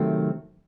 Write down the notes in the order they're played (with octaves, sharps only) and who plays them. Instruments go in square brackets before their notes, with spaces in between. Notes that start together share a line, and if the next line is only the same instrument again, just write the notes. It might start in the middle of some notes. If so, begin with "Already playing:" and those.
Already playing: [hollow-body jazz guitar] C3 D#3 F#3 A3 C4